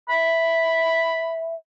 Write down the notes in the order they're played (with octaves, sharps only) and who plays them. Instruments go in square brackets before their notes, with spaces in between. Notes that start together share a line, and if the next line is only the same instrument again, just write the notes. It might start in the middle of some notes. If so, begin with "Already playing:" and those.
[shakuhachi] E5 [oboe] B5